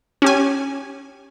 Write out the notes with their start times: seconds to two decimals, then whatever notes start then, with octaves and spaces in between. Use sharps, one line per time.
0.22 C#4 G4 G#5